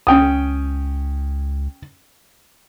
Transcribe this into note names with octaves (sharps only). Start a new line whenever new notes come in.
C#2 C#4 G5 D#6